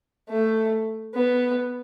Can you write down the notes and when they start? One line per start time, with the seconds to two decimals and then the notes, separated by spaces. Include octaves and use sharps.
0.29 A3
1.14 B3